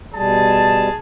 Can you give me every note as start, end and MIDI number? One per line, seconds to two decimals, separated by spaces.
0.13 0.89 47
0.13 0.89 55
0.13 0.97 68
0.13 0.97 81